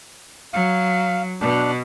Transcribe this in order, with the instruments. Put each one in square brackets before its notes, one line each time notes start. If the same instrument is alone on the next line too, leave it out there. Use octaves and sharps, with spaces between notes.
[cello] F#3 [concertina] F5
[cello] B2 [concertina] D4